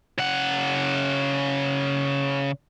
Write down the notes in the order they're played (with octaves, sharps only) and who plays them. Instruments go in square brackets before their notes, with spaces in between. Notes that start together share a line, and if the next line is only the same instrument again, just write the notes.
[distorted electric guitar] C#3 F#5